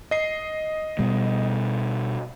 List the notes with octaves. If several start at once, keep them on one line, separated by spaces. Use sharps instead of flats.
D#5 C7
B2 G3